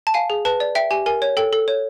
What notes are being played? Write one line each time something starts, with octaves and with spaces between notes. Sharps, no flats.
A5
F5 G#5
G#4
B4 A5
D5
E5 G5
G4 G#5
A#4 G#5
C#5
A4 G5
A4
C#5